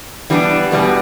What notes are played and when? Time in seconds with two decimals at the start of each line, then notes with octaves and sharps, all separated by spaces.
0.30 E3 G3 B3 D4
0.72 E2 B2 G3 B3